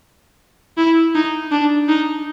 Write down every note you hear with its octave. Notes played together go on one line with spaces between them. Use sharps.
E4
D#4
D4
D#4